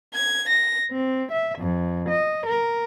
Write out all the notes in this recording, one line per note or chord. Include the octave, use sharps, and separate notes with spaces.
G#6
A#6
C4
E5
F2
D#5
A#4